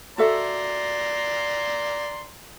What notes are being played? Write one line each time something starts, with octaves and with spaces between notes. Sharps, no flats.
F#4 A4 D5 E5 A#5 C6